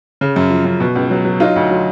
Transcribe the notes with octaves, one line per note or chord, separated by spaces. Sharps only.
C#3
F#2
F3
F#2
B2
C#2
F#3
F#3
F#3 D#4 F4
D2
F#3